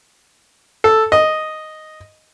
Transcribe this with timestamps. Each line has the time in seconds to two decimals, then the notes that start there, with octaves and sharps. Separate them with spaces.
0.84 A4
1.12 D#5